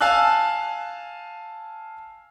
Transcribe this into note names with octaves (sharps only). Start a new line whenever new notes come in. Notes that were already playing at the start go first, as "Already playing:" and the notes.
F5 G#5 A5 E6 F#6